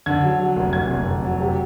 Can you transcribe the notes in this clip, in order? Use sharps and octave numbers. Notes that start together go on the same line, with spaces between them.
D3 G#6
F#3
F#3
F1
F1 G#6
F1
F1
F#3
C3